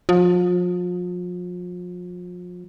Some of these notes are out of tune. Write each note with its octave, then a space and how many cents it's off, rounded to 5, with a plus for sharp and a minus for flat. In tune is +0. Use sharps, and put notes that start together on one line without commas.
F3 +35